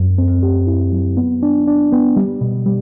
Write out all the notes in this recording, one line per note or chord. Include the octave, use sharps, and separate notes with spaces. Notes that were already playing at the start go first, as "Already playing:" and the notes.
Already playing: F#2
C4
G4
E4
F#3
B3
D4
D4
B3
G3
B2
G3